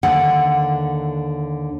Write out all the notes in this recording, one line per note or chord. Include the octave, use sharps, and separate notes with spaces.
D#2 D3 F#5